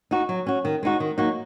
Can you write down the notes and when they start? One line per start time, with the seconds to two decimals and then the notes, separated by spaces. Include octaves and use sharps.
0.11 D#4 F#4
0.29 F#3
0.46 C#4 F#4
0.65 D#3
0.83 G#3 D#4 F#4
1.00 D#3
1.18 F#3 A#3 D#4 F#4